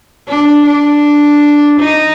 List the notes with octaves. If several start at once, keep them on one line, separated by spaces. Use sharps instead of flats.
D4
D4
D#4